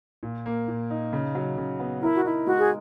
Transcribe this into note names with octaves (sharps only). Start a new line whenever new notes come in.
A#2
A#3
A#2
D#4
C#3
F#3
C#3
B3
E4 A#4
F#4
D#4 E4
G#3 F#4
G#4